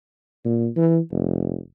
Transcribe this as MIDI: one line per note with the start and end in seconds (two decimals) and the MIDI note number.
0.45 0.68 46
0.76 0.99 52
1.11 1.59 29